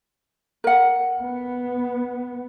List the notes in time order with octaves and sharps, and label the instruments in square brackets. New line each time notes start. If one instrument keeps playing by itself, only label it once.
[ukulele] A#4 F#5
[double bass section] B3